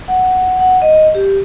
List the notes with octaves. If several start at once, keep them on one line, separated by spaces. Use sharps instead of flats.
F#5
F#5
D#5
G4